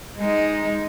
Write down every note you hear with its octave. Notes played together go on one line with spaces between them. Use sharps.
G#3 D#4